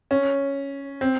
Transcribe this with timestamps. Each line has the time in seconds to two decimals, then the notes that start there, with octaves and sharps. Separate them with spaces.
0.11 C#4
1.01 C4